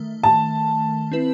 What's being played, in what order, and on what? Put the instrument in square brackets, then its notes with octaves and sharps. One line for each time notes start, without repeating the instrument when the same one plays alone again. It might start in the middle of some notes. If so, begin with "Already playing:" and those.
Already playing: [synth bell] D#3 A3
[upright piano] A5
[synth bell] C4 E4 B4